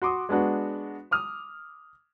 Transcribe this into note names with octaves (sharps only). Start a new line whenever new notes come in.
F#4 C6 D6 D#6
G#3 B3 D4 F#4
D6 D#6 F6